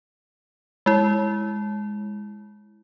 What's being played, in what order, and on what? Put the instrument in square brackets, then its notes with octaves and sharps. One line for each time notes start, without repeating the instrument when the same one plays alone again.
[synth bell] G#3 E4